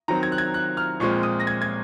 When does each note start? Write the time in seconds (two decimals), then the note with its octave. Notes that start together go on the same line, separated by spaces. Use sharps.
0.08 D#3 F#3 C4 A#5
0.23 G#6
0.32 F#6
0.38 G#6
0.54 F#6
0.77 F6
1.00 A#2 F3 G#3 C4 C#6
1.23 D#6
1.40 A#6
1.47 G#6
1.62 G#6